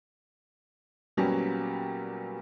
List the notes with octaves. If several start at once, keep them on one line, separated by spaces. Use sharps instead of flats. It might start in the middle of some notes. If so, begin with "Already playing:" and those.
A#2 F#3 G3 B3 C#4 G4